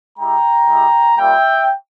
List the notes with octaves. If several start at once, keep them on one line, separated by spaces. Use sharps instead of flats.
G#3 E4 G4 G5 A#5
G#3 E4 G4
G3 A#3 F4 E5 G5